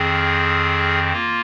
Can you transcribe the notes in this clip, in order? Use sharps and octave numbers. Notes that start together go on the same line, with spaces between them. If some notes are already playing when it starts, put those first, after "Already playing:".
Already playing: F2 D#3 C4 G#4
A#3 F4